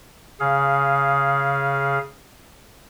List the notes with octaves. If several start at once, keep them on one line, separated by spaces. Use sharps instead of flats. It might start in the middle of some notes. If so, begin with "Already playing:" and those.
C#3 G#4 F5